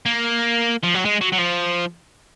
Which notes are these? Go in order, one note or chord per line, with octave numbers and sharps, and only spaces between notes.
A#3
F3
F#3
G#3
F#3
F#3
F3